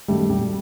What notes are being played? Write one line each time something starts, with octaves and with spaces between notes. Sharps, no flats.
F#2 D#3 F#3 G3 A3
A#1 G3